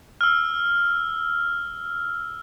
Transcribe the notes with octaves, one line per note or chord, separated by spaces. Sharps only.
E6 F6